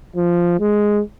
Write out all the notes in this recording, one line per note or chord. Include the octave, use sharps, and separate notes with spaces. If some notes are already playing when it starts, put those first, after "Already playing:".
F3
G#3